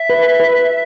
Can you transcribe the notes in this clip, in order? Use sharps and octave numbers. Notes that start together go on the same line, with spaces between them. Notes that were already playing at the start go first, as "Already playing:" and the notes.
Already playing: E5
B4
B4